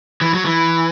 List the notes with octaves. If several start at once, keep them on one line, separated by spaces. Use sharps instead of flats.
E3
F#3
E3